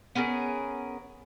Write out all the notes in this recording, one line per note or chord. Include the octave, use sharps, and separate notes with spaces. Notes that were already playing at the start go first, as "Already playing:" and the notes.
B3 C#4 G#4 A#4